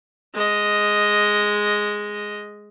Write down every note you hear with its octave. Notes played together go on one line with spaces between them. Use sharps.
G#3 D#5